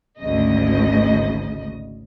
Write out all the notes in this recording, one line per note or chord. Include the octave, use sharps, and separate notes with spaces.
G#1 D2 C#3 D#5